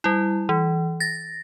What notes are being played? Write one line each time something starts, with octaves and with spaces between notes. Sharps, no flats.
G3 E4
E3
A6 A#6